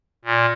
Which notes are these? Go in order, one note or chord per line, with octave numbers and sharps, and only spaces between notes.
A#2